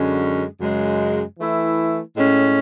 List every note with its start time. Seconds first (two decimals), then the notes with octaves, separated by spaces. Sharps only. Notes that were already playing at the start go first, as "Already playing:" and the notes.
Already playing: F#2 D3 G#3 C#4
0.60 F#2 C#3 G#3
1.38 E3 A3 E4
2.15 A2 G#3 C#4